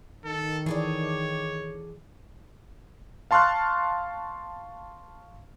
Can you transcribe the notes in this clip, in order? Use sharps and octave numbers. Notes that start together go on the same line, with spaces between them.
D#3 A4
E3 G#4 A4 C#5 D5
F5 A5 C6 C#6 F6 F#6